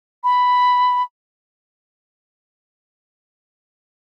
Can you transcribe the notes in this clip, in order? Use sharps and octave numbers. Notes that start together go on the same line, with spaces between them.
B5